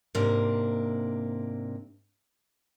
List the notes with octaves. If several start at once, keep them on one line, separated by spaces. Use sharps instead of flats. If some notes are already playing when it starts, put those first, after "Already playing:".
G#2 C3 A#3 D4